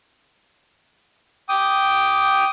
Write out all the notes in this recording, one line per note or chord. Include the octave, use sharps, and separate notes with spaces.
G5 D6 D#6